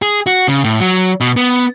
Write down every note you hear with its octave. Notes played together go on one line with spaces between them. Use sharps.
G#4
F#4
C#3
A2
F#3
B2
B3